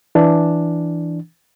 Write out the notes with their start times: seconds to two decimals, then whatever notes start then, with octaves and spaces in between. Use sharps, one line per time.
0.15 E3 D4